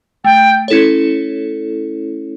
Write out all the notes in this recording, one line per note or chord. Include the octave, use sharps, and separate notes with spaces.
A3 G5
C#4 E4 A4 C#5